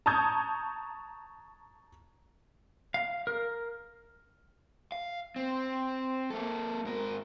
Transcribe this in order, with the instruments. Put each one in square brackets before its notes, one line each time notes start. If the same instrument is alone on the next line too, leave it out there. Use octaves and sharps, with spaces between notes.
[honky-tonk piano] A5 A#5 C#6 D#6 G6 G#6
[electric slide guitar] F5
A#4
[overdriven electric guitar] F5
C4
A#3 A4
G#2 A#4